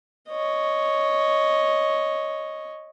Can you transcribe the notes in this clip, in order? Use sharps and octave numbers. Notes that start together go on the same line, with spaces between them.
C#5 D#5